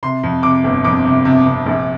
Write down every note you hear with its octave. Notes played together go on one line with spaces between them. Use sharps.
C3 C6
F2
C3 D6
G1
F2 D6
C3
C3
C3
A#1